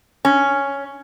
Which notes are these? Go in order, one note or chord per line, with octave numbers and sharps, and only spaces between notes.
C#4